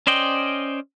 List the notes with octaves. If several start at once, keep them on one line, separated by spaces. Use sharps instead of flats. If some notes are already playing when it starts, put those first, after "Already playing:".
C#4 C5 D5 D#5 G5